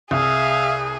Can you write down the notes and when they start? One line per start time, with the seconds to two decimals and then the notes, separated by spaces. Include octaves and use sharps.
0.11 C2 G#4 E5 F5 D#6